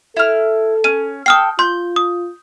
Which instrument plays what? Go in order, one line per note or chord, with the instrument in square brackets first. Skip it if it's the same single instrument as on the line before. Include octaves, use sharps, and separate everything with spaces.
[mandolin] E4 F6 [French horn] A4
[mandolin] C#4 [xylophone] D#7
[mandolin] A4 G5 [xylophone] D#6 F6 C7
[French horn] F4 [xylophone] C6 [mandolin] G6
[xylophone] D#6